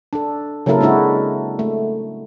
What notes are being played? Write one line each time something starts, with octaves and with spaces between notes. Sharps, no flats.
D4 A4
C#3 F#3 A#3 E4 A4 A#4
G#3 C4 D4 E4 F#4
A3